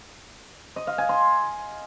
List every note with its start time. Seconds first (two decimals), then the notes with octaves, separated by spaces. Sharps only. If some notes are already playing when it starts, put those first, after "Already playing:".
0.76 D#5
0.87 F5
0.98 G#5
1.09 C6